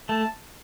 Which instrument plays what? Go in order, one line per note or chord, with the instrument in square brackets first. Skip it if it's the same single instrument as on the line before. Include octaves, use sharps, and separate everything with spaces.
[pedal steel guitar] A3 [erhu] A5